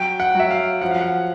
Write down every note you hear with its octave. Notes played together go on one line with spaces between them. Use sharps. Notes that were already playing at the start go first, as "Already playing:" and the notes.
Already playing: F#3 G5
F#5
F#3 E5
F5
F3 F#5
F5
F#5